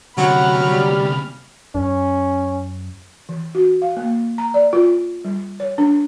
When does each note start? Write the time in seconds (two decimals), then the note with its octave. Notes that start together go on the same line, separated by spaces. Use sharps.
0.17 D2 C3 F#3 F#5 B5 F6
0.66 G3
1.75 F#2 C#4
3.29 E3
3.55 F#4
3.82 F5
3.97 A#3
4.38 A#5
4.54 D5
4.73 F4
5.25 G3
5.60 C#5
5.78 D4